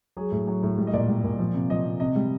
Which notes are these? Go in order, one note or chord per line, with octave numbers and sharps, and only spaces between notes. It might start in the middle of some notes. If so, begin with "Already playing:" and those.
F#3 G#4
A2
F#3
A2
G3
D#5
A#2 D5
G3
A#2
F3
C3
F3 D#5
C3
C3 D#5
G3